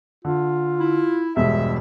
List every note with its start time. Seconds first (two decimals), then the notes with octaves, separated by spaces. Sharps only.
0.25 D3 F4
0.79 E4
1.36 E1 G2 G#3 E5